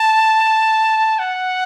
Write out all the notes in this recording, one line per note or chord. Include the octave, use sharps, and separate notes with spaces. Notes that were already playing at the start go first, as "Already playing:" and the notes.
Already playing: A5
F#5